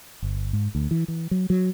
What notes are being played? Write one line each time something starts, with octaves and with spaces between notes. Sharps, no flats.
G1
G#2
D2
E3
E3
F#3
F#3